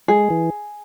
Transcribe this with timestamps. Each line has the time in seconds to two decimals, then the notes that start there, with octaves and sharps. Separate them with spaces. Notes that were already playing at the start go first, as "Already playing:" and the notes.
0.08 G#3 G#4
0.30 E3